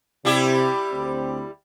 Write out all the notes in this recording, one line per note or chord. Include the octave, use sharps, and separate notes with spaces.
C3 G3 E4 G4
D2 C4